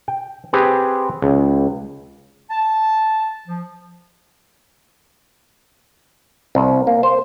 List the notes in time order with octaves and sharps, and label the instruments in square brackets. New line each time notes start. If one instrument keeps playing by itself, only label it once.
[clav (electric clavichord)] G5
C4 G4 G#4 B4
C#2
[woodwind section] A5
F3
[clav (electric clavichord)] C2
A#3
C5